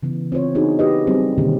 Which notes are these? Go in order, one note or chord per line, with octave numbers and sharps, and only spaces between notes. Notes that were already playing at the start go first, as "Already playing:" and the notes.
C#3 E3 B3
C4 F4 C5 C#5
B3 C4 D4 D#4 F#4 G#4
D#4 F#4 G4 B4 D#5
F#3 G3 C4 G#4
B2 D3 D#3 A#3 C#4 G4